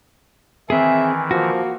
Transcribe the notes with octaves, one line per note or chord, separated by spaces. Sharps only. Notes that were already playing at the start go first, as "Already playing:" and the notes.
D#3 E3 C4 G#4 E5 G#5
F3 A#3 F#4